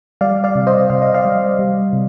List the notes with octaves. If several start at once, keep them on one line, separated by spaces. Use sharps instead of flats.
G3 D5 F5
D5 F5
C3
C5 D#5
C3 F5
D#5
D5 F5
G3
G3
C3